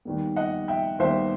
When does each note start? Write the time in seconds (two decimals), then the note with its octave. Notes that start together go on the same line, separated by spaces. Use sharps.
0.05 D#2 D#3 G3 B3
0.36 D#5 F#5
0.68 E5 G5
0.99 D#2 D#3 G3 B3 C5 E5